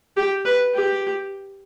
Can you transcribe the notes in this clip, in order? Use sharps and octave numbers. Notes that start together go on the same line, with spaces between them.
G4
B4
G4